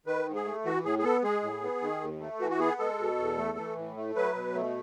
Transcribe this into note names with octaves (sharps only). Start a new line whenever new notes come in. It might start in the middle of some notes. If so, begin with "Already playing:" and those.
D#3 B4
G#2
G#4
A3
E3 F#4
A2 G#4
G#4
B3 A4
G#3 G#4
A2
B3
D#3
D#2
A3
E3 F#4
F#4
B3 G#4
G#3 A4
B2
E2
A3
E3
A2
A3
F#3 B4
B2
A3